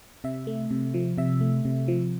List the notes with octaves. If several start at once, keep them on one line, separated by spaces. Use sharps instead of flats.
C3 E5
A3
C3
F3
C3 E5
A3
C3
F3